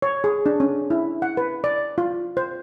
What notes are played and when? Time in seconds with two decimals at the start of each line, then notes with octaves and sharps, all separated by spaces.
0.02 C#5
0.24 G#4
0.46 D4
0.60 C#4
0.90 E4
1.22 F#5
1.37 B4
1.64 D5
1.98 F4
2.37 C5